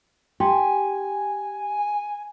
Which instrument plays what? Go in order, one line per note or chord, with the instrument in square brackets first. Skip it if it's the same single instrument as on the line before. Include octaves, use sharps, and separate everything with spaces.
[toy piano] D#4 G5 C6 [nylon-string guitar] G4 [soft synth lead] G#5